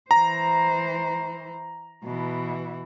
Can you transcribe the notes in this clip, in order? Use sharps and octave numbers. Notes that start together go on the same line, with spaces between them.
E3 C5 A#5
B2 E3